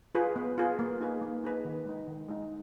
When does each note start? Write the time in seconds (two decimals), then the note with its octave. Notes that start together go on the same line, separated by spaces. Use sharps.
0.15 F4 G#4 B4
0.36 B3
0.58 F4 G#4 B4
0.79 A#3
1.01 D#4 G#4 B4
1.22 A#3
1.44 D#4 G#4 B4
1.65 D#3
1.86 G#3 D#4
2.08 D#3
2.29 G#3 D#4